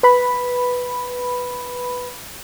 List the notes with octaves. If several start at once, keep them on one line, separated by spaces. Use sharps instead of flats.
B4 B5